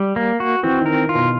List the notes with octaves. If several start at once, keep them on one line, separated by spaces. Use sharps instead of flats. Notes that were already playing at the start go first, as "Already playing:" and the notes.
Already playing: G3
A#3
F#4
E3 C4
D#3
A#4
F4
B2